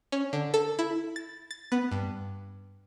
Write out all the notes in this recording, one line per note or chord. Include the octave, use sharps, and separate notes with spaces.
C#4
D3
A4
E4
A6
A6
B3
G2